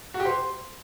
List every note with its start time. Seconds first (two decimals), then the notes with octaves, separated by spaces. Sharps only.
0.14 F#4
0.20 G4
0.25 C5